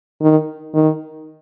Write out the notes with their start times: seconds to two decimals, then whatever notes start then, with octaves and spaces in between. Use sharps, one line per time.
0.21 D#3
0.74 D#3